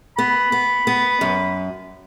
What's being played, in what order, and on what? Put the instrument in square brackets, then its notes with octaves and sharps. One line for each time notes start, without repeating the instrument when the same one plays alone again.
[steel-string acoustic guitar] B3 [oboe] B5
[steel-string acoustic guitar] B3
B3
F#2